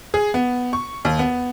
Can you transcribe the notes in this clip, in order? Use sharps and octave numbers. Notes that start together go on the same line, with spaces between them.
G#4
B3
C#6
D#2
B3